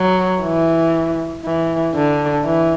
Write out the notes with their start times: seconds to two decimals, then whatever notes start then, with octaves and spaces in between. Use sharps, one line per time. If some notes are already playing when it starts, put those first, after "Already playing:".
Already playing: F#3
0.42 E3
1.45 E3
1.95 D3
2.45 E3